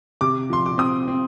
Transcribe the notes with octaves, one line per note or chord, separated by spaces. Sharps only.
C3 D6
F3 C6
D6
C4 D#6
C4